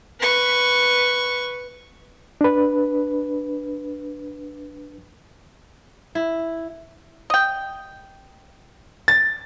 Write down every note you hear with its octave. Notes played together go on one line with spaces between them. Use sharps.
B4 C#6
D4 B4
E4
D#5 G5
A6